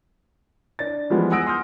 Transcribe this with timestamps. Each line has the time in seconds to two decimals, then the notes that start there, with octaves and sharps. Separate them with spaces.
0.79 D4 A6
1.10 E3 F3 G3 G#3 B3 F4
1.31 F#5 G#5 D#6 E6 A#6 D7
1.47 C6 D#6 F6 G6